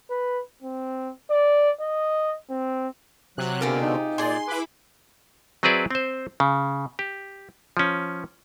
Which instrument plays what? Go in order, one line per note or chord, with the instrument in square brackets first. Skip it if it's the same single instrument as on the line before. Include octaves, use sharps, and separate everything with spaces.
[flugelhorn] B4
C4
D5
D#5
C4
[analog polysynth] C3 [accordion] F#3 F#6
[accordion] B2 D3 [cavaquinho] F4 G4 G#4 [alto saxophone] A#4
[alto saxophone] D#4
[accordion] A#2 D5 [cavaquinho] G#4 G#5 [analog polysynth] C6
[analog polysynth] E4 B5 D6 [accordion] B4
[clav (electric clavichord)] F#3 C4 G#4 B4 D5 E5
C4 C5
C#3
G4
F3 C#4